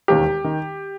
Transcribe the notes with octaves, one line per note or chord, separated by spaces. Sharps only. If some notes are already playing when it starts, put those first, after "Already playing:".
E1 D#2 D#3 G4
D#3